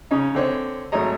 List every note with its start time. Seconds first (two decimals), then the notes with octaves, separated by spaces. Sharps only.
0.11 C#3 C#4 D#4
0.35 D3 C4 C#5
0.92 G#1 F#3 A3 C#5 D#5 A#5